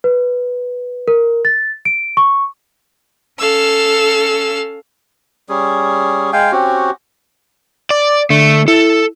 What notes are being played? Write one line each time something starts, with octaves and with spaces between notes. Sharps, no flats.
B4
A#4
A6
D7
C#6
C#4 A4 F5 E6
G3 C#4 G#4
G#3 F5 G5 G#5
C4 C#4 F#4 G4
D5 D6
D3 A3
E4 A4